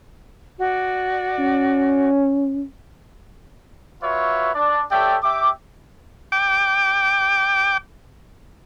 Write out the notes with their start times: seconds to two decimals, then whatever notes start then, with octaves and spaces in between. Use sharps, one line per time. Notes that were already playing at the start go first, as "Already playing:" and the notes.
0.58 F#4 D5
1.39 C#4
4.03 F4 F#4 B4 C#5 E5
4.54 D4 D5
4.91 G4 A4 C#5 D5 E5 G5
5.23 G4 E5 G5 D6
6.32 G5 D6